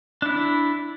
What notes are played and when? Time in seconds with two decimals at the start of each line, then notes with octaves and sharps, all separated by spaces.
0.22 D4 E4